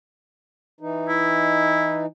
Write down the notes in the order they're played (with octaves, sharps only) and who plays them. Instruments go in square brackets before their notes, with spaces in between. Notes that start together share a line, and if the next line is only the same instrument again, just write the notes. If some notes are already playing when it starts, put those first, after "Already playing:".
[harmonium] E3 D#4
[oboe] E4